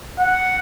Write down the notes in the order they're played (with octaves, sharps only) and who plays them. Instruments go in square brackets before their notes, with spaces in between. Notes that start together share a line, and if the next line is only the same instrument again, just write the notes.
[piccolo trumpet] F#5